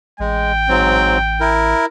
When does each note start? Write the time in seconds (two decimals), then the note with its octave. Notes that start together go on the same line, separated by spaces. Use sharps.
0.20 A1 G#3 G5
0.69 G#2 F#3 C4
1.40 E4 A#4